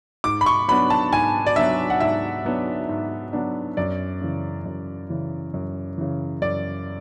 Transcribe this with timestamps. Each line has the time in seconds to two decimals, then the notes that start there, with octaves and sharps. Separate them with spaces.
0.24 G#2 D6
0.41 B5
0.46 C#6
0.68 F#3 B3 D4 B5
0.90 A5
1.12 G#2 G#5
1.46 D5
1.56 F#3 B3 D4 E5
1.90 F#5
2.00 G#2 E5
2.45 F#3 B3 D4
2.89 G#2
3.33 F#3 B3 D4
3.77 F#2 D5
4.21 C#3 E3
4.66 F#2
5.10 C#3 E3
5.54 F#2
5.98 C#3 E3
6.42 F#2 D5